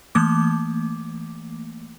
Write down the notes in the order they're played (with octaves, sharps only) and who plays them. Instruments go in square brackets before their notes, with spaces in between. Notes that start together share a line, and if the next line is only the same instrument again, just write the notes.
[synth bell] E3 A3 A#3 D6